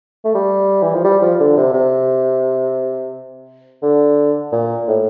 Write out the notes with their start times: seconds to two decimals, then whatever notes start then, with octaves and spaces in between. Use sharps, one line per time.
0.24 A3
0.34 G3
0.82 E3
0.94 F3
1.04 G3
1.22 F3
1.40 D3
1.57 C3
1.73 C3
3.82 D3
4.52 A#2
4.88 A2